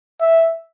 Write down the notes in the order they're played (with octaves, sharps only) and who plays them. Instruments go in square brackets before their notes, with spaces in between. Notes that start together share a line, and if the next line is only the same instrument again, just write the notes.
[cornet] E5